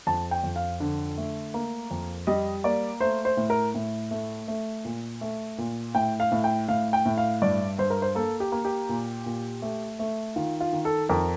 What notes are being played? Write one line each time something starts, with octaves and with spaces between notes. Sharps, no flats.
F2 A5
G5
F2
F5
D3
A3
A#3
F2
G3 D#5
A#3 D5
A3 C5
C5
A2
A#4
A2
A3
A3
A#2
A3
A#2
A2 G5
F5
A2
G5
A2 F5
G5
A2
F5
G2 D5
G2 C5
A#4
C5
A#3 A4
G4
A#3
G4
A#2
A#2
A3
A3
D#3 F4
F4
D#3
A4
F2 A#4